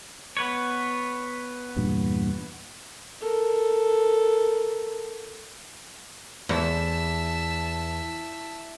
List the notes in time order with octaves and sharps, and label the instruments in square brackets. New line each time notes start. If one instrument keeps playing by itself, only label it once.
[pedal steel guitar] B3 B4 C#5
[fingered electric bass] E2 G2 A#2
[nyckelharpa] A4 A#4
[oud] E2 [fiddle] E5 A5